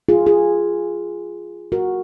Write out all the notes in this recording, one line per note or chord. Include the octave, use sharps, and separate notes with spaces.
F4 G#4
F4 G#4
F#4 A#4